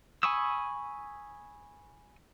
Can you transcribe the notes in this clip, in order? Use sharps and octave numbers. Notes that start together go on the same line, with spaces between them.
G#5 B5 C#6 D#6 E6